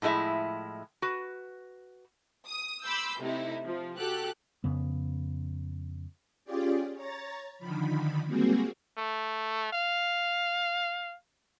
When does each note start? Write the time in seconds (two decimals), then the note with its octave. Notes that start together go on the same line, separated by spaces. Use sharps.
0.02 A2 F3 G#3 E4 E5
1.02 F#4 B4
2.48 D#6
2.82 B5 C6 D6 E6 G6
3.21 C3 A3 D#4 E4
3.65 F3
3.97 F#4 G4 A4 F#6
4.64 F2 C#3 B3
6.45 C#4 F4 G4 G#4 D5
6.95 C#5 A#5 A6
7.58 D3 D#3 F3 B5
8.26 G3 G#3 A#3 C4 F#4 G#4
8.98 A3
9.73 F5